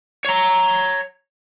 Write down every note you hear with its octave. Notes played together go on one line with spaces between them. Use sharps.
C#5 A#5